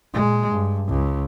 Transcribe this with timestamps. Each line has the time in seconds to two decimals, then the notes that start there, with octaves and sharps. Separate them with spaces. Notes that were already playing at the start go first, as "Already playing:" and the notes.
0.13 A#2 G#3
0.51 G2
0.88 C#2